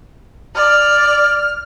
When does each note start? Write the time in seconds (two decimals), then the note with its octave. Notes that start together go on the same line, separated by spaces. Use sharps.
0.56 D5 F6